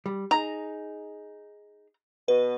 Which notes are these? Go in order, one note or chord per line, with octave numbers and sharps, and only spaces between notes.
G3
D#4 G#4 A#5
B2 B4